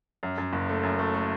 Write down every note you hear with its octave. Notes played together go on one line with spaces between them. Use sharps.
F#2
F#2
F#1
A3
F#2
A3
A3